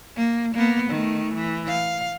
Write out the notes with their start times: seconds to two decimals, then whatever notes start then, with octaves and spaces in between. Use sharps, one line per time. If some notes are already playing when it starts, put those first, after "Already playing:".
0.17 A#3
0.55 A#3 B3
0.90 D#3 A3
1.35 E3
1.68 F5